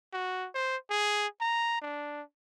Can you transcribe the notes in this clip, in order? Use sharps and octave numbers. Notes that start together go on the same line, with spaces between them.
F#4
C5
G#4
A#5
D4